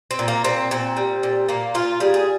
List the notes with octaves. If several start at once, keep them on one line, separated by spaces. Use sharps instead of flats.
C4
A#2
A#3
A#2 C4
A#2 C4
G3
A#2
A#2 A#3
A#2 F4
G3 G#4
G#4